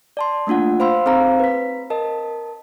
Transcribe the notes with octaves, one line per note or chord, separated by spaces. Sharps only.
D5 A5 C6
A3 A#3 D4 F4 F#5
C5 F5 B5 C6 E6
C4 D#4 G#4 C5 F5 A#5
B4 B6
A#4 D#5 A5